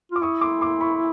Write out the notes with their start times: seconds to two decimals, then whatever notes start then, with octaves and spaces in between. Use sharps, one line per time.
0.12 F4 D6
0.22 E4 C#6 D#6
0.41 C6 D6
0.61 C6 D6
0.81 B5 C#6